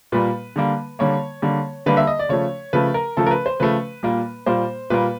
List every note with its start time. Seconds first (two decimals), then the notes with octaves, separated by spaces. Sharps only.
0.12 A#2 G3 A#3 B4
0.56 D3 G3 A#3
0.99 D3 G3 A#3 C#5
1.42 D3 G3 A#3
1.86 D3 G3 A#3 B4
1.97 E5
2.07 D#5
2.19 D5
2.29 C#3 F3 A3 C#5
2.73 C#3 F3 A3 B4
2.94 A#4
3.17 C#3 F3 A3 A4
3.26 A#4
3.31 B4
3.46 C5
3.60 C#3 F3 A3 B4
4.03 A#2 G3 A#3
4.46 A#2 G3 A#3 C5
4.90 A#2 G3 A#3 B4